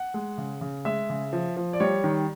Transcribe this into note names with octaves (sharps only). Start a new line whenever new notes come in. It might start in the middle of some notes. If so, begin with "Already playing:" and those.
Already playing: F#5
G#3
C#3
C#3
G#3 E5
C#3
F3
F3
D5
G3 C#5
D#3